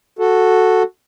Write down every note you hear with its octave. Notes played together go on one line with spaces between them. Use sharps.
F#4 A4